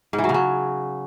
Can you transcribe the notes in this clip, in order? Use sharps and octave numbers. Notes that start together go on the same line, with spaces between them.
G#2
E3
F#3
C#3
F#3